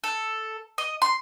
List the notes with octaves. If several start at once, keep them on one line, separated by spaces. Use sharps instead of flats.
A4
D#5
C6